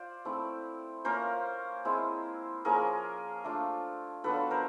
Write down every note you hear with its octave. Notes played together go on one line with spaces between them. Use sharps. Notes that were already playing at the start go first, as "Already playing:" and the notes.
Already playing: F4 C5 D5
A3 C4 E4
A#3 C#4 F4 A#4 C5
G#3 C4 E4
F3 A#3 C#4 G#4 A#4
A3 D4 F4
F#3 B3 D4 F4 A4 B4
A#4 C5